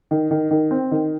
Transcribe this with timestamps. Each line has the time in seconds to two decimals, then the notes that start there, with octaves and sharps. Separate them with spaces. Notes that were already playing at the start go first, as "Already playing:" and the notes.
0.11 D#3
0.31 D#3
0.51 D#3
0.71 C4
0.91 D#3